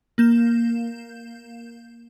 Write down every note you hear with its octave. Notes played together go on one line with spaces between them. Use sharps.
A#3 G6 E7